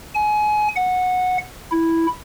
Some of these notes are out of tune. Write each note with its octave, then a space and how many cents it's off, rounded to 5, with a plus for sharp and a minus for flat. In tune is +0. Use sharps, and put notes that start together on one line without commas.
G#5 +25
F#5 -15
E4 -5